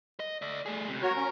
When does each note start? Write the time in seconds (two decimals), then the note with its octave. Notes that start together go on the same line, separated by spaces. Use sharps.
0.20 D#5
0.42 D5 E5
0.66 A3 G#4
0.88 C#2 C3
1.03 F#4 A#4 C#5
1.16 C#4